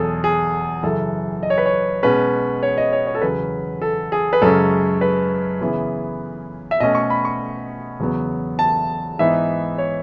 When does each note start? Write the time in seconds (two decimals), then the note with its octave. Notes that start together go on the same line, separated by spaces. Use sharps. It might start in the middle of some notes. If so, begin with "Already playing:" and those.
Already playing: E2 B2 F#3 G#4 A4
0.24 G#4
0.83 F#2 C#3 E3 A4
1.43 D#5
1.50 C#5
1.58 B4
1.66 C#5
2.03 B2 G#3 C#4 B4
2.63 C#5
2.77 D#5
2.93 C#5
3.07 C#5
3.15 A4
3.22 E2 C#3 F#3 C#4 B4
3.82 A4
4.12 G#4
4.33 B4
4.42 F#2 C#3 G#3 C#4 A4
5.01 B4
5.61 C#3 E3 B3 E4
6.71 E5
6.80 B2 A3 C#4 D#5
6.95 C#6
7.10 B5
7.25 C#6
8.00 E2 C#3 F#3 B3
8.59 A5
9.19 G#2 E3 B3 D#4 E5
9.78 C#5